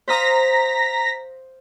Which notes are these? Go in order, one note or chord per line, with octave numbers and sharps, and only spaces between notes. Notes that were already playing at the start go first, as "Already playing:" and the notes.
C5 F5 A#5 D#6 A#6 B6